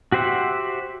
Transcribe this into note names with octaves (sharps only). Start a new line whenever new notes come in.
F#4 G4 C5 E5 F#5